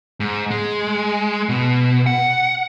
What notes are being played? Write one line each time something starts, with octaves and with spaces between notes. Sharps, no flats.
G#2
G#3
B2
F#5